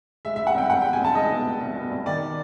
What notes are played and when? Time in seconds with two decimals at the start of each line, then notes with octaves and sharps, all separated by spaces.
0.25 G#3 E5
0.36 G#3 E5
0.47 F#5
0.54 C2 G5
0.70 C2 F#5
0.82 B2 G5
0.93 G#5
1.00 C2 A5
1.15 G#3 D#5
1.30 B2
1.46 G#3
1.61 C2
1.76 B2
1.90 C2
2.06 D#3 D5